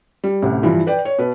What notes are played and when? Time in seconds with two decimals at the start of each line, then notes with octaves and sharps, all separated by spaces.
0.24 G3
0.42 A1 D2 C3
0.63 G2 E3 F3
0.87 B4 D5 G5
1.05 C#5
1.19 B2 B4